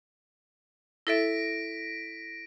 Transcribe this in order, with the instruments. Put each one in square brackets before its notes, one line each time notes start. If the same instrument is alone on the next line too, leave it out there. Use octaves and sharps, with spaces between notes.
[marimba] E4 A4 E5 [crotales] A#6 B6 D7